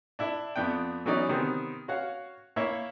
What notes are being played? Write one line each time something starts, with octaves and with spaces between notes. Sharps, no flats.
D4 E4
F2 B3 D4 G5
E3 F#3 B3 C#4 D#4 D5
C3 D#3 B3 C4
F#4 C#5 F5 F#5
A#3 E4 C#5 E5